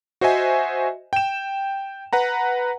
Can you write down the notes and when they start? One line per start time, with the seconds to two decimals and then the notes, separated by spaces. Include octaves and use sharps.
0.21 F#4 C5 D#5 E5 G#5
1.13 G5 E7
2.13 B4 F#5 A#5